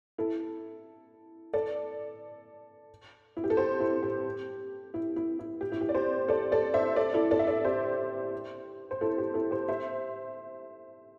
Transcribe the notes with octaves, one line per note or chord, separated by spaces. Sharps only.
E4 A4
A4 D5
E4
G4
A4
G4 C5
E4
G4
E4
E4
E4
G4
E4
G4
D5
G4 C5
A4 D5
A4 D5
C5 E5
A4 D5
E4 A4
A4 D5
E5
A4 D5
G4 C5
C5
E4 A4
G4
E4 A4
G4 C5
C5 E5